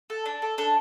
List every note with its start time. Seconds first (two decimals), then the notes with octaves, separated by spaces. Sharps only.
0.10 A4
0.26 D4
0.42 A4
0.58 D4 A4